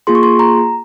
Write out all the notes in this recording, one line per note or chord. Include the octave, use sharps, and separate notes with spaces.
A#3 F4 G#4 C6
C#6
C6
A#5